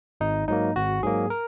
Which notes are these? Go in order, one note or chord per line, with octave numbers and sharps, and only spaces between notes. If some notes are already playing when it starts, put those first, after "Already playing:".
G#1 D#4
G#2 F#3 A#3 D#4
G#1 F#4
G#2 F#3 A#3 G#4
A#4